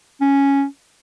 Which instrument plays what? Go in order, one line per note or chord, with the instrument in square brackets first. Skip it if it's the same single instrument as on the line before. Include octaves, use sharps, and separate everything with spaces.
[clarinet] C#4